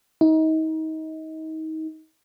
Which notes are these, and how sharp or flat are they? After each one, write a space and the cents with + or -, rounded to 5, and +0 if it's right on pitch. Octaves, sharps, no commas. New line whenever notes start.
D#4 +30